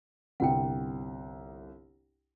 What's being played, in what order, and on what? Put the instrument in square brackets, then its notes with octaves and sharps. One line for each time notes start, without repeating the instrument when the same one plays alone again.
[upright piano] G1 C2 [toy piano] F#5 G5